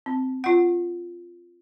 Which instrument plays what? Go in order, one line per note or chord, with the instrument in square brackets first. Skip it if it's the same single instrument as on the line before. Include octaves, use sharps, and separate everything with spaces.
[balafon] C4
F4 F#5